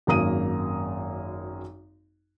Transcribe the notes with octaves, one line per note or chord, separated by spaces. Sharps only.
G#1 F#2 A#3 A#5 D#6 D#7